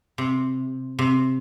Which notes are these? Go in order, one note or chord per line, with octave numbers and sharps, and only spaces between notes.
C3
C3